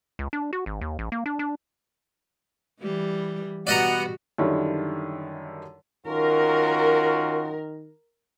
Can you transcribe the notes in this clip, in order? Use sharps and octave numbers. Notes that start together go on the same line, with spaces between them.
C#2
D4
F#4
G#1
D#2
A1
A#3
D4
D4
E3 G3
B2 G3 B3 F#4 D5 D#5 F#5 A#5
F#2 D3 D#3 G3 E4
D#3 C#4 F4 F#4 A#4